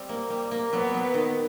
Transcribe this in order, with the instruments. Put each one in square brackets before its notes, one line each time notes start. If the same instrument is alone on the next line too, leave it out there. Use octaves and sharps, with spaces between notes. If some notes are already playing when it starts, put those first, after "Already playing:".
Already playing: [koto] G3 C4
A#3
G3
A#3
[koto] F#3 [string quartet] B3
[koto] F#3
D#3